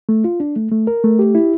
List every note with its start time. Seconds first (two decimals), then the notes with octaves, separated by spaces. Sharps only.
0.09 A3
0.24 F4
0.40 D4
0.56 A3
0.71 A3
0.87 A#4
1.04 A3
1.19 G4
1.35 E4